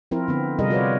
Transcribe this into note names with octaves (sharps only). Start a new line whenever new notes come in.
F3 C4 E4 A#4
D3 B3 C4
C3 G3 F4 G#4 A#4 D#5
F4 F#4 A#4 B4 C#5 D5